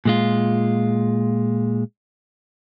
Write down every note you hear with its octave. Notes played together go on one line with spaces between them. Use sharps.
A#2 G#3 F4